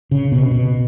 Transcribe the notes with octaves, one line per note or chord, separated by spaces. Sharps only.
C#3
B2
B2